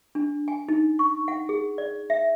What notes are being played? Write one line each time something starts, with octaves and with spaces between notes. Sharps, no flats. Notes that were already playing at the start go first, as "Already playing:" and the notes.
D4
G#5
D#4
C#6
F#5
G#4
D5
E5